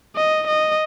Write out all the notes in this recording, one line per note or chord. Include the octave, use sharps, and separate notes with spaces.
D#5
D#5